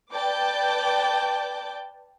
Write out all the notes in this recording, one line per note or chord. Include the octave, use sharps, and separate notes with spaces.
B4 D5 G5 A5 D6 G6